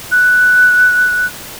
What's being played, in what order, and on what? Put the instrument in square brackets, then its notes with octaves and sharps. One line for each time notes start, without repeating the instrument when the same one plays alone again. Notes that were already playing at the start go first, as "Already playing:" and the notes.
[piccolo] F#6